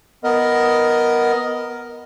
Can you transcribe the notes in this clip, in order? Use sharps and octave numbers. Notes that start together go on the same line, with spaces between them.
B3 A#4 D#5